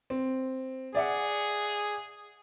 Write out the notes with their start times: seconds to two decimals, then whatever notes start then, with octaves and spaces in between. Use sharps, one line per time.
0.10 C4
0.95 G#4 D5 E5 F#5